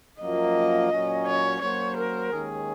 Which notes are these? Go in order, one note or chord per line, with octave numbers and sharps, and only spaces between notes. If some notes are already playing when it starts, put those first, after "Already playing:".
F#2 F3 A#3 F4 D#5
A#2 F#3 C#4
C#5
F#3 A#3 C#4 F#4 C5 C#5
A#4
D#2 D#3 G#3 C#4 G#4